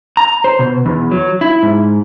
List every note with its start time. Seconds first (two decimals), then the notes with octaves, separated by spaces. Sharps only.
0.17 A#5
0.44 C5
0.59 B2
0.86 E2
1.11 F#3
1.41 E4
1.63 G#2